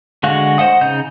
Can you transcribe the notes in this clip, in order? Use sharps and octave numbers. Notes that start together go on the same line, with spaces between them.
D3 G#3 F#4 F5 F#6
C5 D#5 F#5 D#6
C#3 D#4 G6